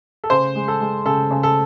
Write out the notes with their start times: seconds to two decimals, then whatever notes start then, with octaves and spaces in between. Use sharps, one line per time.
0.24 A4
0.30 C#3 C5
0.55 G#3
0.68 A4
0.81 G#3
1.06 C#3 A4
1.31 C#3
1.43 A4